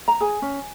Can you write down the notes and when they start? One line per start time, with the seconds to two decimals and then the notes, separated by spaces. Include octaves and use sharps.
0.08 A#5
0.21 G#4 G#5
0.42 C#4